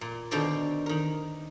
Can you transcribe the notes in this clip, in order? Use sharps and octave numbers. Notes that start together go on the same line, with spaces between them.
A#2
B2 D3 D#3 C4 A#4 D5
D#3 A#4